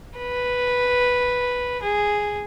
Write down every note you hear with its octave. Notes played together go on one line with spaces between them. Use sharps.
B4
G#4